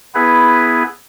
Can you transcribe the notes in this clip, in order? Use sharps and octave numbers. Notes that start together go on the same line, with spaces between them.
B3 E4 G#4 B4